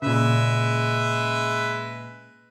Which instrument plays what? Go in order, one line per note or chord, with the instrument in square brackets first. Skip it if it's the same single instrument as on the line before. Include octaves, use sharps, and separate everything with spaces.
[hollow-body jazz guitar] A#2 C#3 [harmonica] G#3 B4 E5